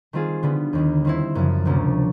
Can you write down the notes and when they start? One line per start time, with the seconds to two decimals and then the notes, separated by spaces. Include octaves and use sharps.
0.13 D#3 G3 C4 F4 G#4
0.43 D3 G3 B3
0.73 D#2 D#3 G3
1.04 D#3 G3 C4 E4
1.35 F#2 C#3 F3
1.65 D2 C3 F3 A#3 C#4